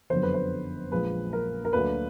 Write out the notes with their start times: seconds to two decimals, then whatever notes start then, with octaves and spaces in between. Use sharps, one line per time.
0.10 F#1 F2 D3 F#3 B3 C5
0.23 B4
0.34 C5
0.92 A#1 A#2 F3 G#3 B4
1.33 A#4
1.65 A#4
1.73 D2 D3 F#3 A#3 D4 B4